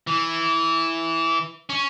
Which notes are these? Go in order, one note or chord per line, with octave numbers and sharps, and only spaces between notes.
E3
C#4